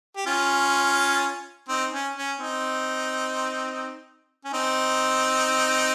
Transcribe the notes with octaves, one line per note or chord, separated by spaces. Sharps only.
G4
C#4 F4
C4 D#4
C#4
C#4
C4 D#4
C#4
C4 D#4